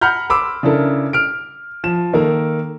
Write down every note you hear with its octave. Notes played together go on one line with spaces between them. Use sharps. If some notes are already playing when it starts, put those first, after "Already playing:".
F#5 A#5 B5 F6 G6
B5 C6 D6 E6
C#3 D4 E4 A4 A#4
F6 D7
F3 E7
D#3 A#3 A4 A#4